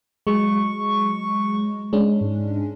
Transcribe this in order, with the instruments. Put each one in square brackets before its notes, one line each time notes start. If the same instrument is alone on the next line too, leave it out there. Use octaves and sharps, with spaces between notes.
[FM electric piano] F#3 G#3 [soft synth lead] C#6
[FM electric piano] G#3 C#4 D4
[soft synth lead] G#2